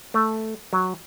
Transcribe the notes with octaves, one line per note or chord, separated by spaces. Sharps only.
A3
F#3